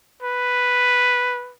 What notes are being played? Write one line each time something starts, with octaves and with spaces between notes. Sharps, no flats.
B4